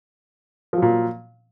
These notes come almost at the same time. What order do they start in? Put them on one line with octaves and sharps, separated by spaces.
F3 F#3 A#2